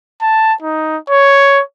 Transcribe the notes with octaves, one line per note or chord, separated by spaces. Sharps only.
A5
D#4
C#5